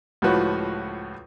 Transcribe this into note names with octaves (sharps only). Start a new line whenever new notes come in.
C#2 A2 F3 F#4 B4